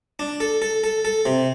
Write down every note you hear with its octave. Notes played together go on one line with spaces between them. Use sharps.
D4
A4
A4
A4
A4
C3